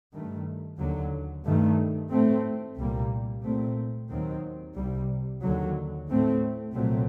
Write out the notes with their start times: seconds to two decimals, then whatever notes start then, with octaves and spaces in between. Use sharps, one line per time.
0.13 G2 D#3 A3
0.78 D#2 D3 F#3
1.45 G2 D#3 A3
2.11 A2 A3 C4
2.77 C2 A#2 G3 A#3
3.44 A#2 A3 C4
4.10 D#2 D#3 F#3 C4
4.75 C2 C3 G3
5.42 D#2 D3 F#3
6.08 A2 A3 C4
6.74 C2 A#2 F#3 A3 C4